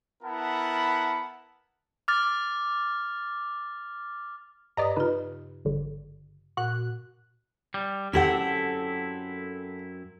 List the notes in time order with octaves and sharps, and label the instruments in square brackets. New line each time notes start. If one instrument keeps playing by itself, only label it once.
[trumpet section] B3 E4 A#4 F#5 A5 B5
[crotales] D6 F6 A6
[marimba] G2 B4 D#6 [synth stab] D5 D#5 A#5
[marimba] C#3 F4 [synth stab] D#4 B4
[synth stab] G#1 D3
[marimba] A#2 [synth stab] F#4 F#6
[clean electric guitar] G3
[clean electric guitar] F#2 C4 E4 [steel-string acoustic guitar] G4 A4 F#5